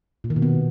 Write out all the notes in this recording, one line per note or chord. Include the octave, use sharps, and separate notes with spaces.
A#2
D#3
B2
B3